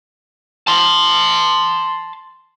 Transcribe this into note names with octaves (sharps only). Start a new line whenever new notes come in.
A5 C6